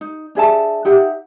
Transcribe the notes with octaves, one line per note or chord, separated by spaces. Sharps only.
D#4
D4 G#4 E5 A5
D#4 G4 E5 F#5